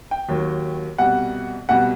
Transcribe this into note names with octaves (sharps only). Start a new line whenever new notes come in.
G5
D#2 D#3 F#3
C2 B2 G3 F#5
C2 B2 G3 F#5